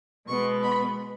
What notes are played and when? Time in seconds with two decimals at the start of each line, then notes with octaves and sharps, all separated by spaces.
0.27 B2 G#3 B3 C#6
0.62 B5